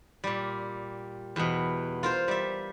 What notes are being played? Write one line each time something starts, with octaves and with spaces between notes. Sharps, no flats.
A#2 G3
E2 B2
F4 A#4 C5
G3 E5